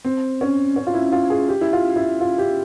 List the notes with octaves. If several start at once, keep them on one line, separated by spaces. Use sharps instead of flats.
C4
C#4
C#4
F4
E4
F4
G#4
G4
E4
F4
E4
F4
G4